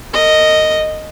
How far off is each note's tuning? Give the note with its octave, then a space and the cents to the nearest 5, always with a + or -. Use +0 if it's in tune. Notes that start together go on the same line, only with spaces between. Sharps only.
A#4 -45 D#5 +0